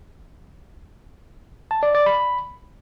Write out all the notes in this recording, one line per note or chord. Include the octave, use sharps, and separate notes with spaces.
A5
D5
D5
B5